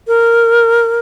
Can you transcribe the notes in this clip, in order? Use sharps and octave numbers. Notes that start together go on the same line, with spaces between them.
A#4